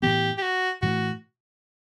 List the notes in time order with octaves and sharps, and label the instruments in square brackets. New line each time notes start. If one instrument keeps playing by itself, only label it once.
[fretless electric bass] A2 E3 B3 [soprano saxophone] G4
[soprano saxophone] G4
F#4
[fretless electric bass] A2 E3 A3 [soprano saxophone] F#4